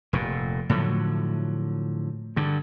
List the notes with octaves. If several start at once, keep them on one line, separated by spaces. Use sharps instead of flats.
F1 A#2
A2 D3 F3 F#3
G2 D3